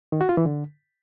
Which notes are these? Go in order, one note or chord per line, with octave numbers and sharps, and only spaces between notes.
D#3
F#4
F4
E3
D3